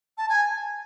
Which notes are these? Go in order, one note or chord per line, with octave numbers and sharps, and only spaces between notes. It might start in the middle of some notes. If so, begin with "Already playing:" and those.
A5
G#5